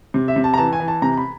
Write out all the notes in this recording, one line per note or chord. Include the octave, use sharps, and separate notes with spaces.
C3
E5
C3
A5
A#5
E3 A5
G#5
E3
A5
C3 A#5
B5